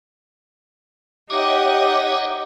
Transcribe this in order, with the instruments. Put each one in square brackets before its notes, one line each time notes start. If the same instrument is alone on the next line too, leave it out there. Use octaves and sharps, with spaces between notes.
[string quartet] D#4 F#5 D#6 [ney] G4 [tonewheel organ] C#5 D#5 E5 [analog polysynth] D6